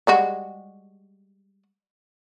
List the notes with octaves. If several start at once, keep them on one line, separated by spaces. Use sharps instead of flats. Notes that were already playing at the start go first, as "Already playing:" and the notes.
G3 G#3 F#4